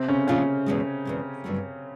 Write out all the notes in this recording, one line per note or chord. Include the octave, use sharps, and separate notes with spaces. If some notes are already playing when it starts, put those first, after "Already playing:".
Already playing: C3 C4
C#3 C#4
A#2 C#3 F3 A3 C#4 D4 F4
E2 B2 G#3
E2 B2 G#3
G2 D3 F#3 A3